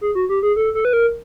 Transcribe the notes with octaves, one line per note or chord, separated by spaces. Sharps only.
G#4
F#4
G4
G#4
A4
A4
B4
A#4